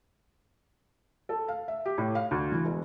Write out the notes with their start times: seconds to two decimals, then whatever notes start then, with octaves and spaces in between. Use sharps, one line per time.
1.29 A4
1.48 F5
1.68 E5
1.86 G4
1.98 A2
2.15 F5
2.31 D2
2.52 E3
2.64 E1